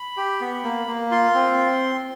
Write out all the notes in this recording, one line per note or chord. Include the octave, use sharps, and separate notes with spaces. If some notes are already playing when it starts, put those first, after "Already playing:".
Already playing: B5
G4
B3
A#3
A#3
F4 C6
C4